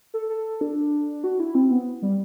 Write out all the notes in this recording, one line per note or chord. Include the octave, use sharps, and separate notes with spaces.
A4
A4
D4
F#4
E4
C4
B3
G3